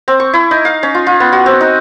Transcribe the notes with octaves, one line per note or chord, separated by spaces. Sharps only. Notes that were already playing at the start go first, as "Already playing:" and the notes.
C4
C#6
E4
D#4
F5
C#4
F4
F4
B3
F#4
C4
D#4